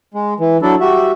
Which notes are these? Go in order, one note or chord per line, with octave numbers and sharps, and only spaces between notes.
G#3
E3
F#3 D4 E4 A4
G3 F#4 E5